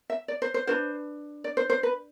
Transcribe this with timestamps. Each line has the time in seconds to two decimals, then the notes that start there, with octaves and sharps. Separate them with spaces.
0.10 E5
0.28 D5
0.42 C5
0.54 C5
0.67 D4 F4 B4 C5
1.44 D5
1.57 C5
1.70 C5
1.83 B4